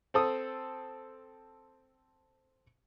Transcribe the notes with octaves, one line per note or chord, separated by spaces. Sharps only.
C4 A4 D#6